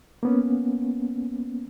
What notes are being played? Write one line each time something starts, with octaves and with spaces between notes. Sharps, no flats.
A#3 B3 C#4